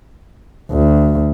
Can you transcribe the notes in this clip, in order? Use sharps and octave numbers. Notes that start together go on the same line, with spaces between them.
D2